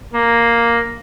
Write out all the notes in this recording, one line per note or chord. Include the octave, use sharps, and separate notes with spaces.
A#3